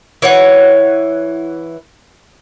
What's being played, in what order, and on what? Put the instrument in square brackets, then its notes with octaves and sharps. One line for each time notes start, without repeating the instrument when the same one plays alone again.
[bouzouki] E3 C#5 F#5